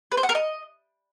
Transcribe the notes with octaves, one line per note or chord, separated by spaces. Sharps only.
B4
C5
F#5
A#4
D#5